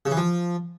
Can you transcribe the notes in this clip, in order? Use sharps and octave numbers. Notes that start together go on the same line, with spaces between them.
C#3
E3
F3